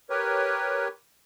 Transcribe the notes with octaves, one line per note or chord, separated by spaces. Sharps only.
G4 A#4 B4 C#5